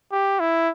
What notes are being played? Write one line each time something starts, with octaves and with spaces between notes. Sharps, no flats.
G4
E4